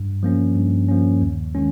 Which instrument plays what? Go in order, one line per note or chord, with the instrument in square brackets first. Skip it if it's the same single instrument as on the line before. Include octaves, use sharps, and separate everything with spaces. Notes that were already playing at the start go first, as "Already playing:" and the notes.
Already playing: [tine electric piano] G2
F3 A#3 C#4
G2
F3 A#3 C#4
D#2
D#3 G#3 C#4